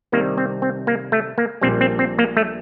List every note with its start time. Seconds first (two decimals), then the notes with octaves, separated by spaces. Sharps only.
0.12 C2 C3 D#3 G3 A#3
0.38 C4
0.62 C4
0.87 A#3
1.12 A3
1.38 A#3
1.61 A#1 A#2 G3 C4
1.81 C4
1.99 C4
2.19 A#3
2.37 A3